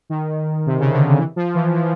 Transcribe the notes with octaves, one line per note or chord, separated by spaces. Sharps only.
D#3
C3
C#3
D3
D#3
E3
F3
E3
E3